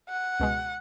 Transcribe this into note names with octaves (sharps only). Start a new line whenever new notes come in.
F#5
C#2 B2 G#3